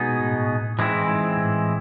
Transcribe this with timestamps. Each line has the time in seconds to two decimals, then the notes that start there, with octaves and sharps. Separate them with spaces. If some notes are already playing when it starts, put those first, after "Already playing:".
Already playing: B2 G#3 B3 D#4
0.09 A#2
0.20 A2
0.35 G#2
0.49 G#2
0.79 G#2 E3 G#3 C4 E4
0.94 G#2
1.08 G#2
1.37 A2